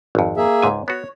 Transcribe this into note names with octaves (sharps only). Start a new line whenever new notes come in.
G#1 F2
A#3 G#4 E5
C#2 G#2 G#5
B3 F#4 C#5